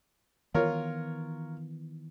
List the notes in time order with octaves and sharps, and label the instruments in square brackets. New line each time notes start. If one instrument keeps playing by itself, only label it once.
[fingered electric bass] D#3 E3 B3 [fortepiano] F4 A#4 C#5